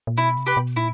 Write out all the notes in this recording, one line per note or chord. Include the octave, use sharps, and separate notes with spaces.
A#2
B2 E4
C3
G4 B4
B2
A#2 E4